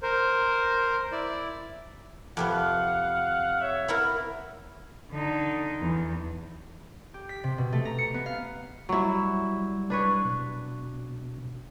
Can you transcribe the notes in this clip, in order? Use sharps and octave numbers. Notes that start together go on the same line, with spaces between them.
A#4 C5
E4 D5
F2 C3 B3 F5 F#5
C#5 E5
B3 E4 A#4
D3 D#4
E2
G4
B6
C3
B2
A3
A#5
C#7
B3
F5
F#3 G3 E4
D4 B4 C#5
B2